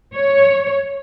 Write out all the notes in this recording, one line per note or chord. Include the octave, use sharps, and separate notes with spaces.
C#5